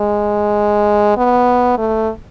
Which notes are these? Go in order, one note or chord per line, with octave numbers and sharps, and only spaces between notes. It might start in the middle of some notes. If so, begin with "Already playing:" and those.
Already playing: G#3
B3
A3